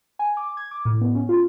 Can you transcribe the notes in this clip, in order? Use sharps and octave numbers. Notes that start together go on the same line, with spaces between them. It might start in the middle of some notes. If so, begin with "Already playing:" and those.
G#5
D6
G#6
D6
A2
B3
C#4
F4